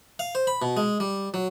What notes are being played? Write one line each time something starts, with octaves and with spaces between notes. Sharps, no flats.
F5
C5
B5
B2
G#3
G3
F#3